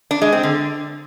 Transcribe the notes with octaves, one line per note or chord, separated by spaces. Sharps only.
D4
G#3
C4
D3